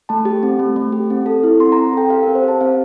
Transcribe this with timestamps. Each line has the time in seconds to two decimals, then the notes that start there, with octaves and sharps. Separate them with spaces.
0.09 A3 A5
0.25 G4
0.43 C4
0.59 A3
0.76 A3
0.93 G4
1.10 C4
1.26 A4
1.44 E4
1.60 C4 C6
1.72 C4 A#5
1.93 A4 G5
2.10 G4 F5
2.23 C4 A#4
2.35 C5
2.43 G4 A5
2.61 C4 F5